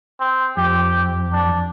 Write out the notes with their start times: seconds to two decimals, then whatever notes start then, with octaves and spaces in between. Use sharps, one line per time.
0.20 C4
0.57 F2 G4
1.33 D4